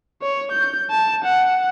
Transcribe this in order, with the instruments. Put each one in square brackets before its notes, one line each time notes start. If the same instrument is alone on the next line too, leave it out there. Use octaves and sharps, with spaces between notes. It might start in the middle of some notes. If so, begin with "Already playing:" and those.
[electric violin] C#5
G6
A5
F#5